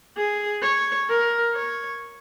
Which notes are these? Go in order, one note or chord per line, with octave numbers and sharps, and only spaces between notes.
G#4
C#5
A#4
C#5